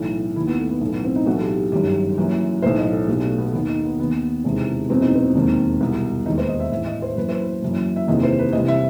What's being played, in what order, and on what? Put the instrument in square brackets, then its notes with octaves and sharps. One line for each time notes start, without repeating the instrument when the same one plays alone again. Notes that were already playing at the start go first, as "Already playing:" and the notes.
Already playing: [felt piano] B1 A2 E3
D#2 D#3 E4
B3
A3
B3
B1 A2 E3 A3
B3
C4
D#4
B1 A2 E3 F#4
A4
G4
G1 F#2 D#3 G4
F#1 F#2 E3
B1 A2 E3 C5
D#5
A4
B1 B2 G4
A3
B3
D#2 D#3 B3
D#4
B3
D#2 D#3 B3
E1 E2 C3 D#3
F#1 E2 B2 C4
D#4
C4
E1 D#2 D#3
C2 B2
E1 D#2 D#3 D#4
C5
D#5
E5
A1 A2 E3 E5
D#5
C5
F#1 F#2 E3 B4
C5
B4
F#1 F#2 E3
E5
F#1 E2 C3 D#3 D#5
C5
B4
C2 C3 E3 D#5
E5